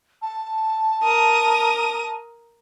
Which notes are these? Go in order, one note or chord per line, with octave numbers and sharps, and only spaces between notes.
A5
A#4 D#6